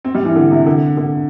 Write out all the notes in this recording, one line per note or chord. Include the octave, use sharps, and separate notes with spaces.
C4
G3
E3
D3
C3
D3
D3